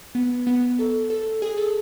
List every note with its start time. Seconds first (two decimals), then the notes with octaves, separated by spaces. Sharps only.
0.15 B3
0.47 B3
0.79 A4
1.10 A4
1.42 G#4
1.57 A4